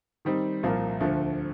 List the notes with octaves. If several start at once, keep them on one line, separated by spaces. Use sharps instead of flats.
D#3 G3 C4 D#4
C2 A#2 F3 A#3
D2 D3 F3 A3